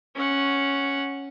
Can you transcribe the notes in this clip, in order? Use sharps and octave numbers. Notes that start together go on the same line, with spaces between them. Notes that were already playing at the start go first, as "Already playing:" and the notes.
C#4 F#5